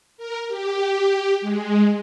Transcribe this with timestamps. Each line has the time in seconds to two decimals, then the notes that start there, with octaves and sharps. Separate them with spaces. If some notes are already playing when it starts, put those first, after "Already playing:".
0.17 A#4
0.48 G4
1.41 G#3